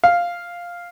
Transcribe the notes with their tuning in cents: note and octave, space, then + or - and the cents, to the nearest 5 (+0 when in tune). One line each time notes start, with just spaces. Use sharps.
F5 +0